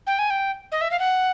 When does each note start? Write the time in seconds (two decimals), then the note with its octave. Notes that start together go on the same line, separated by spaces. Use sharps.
0.07 G5
0.19 G#5
0.30 G5
0.72 D#5
0.81 E5
0.91 F5
0.99 F#5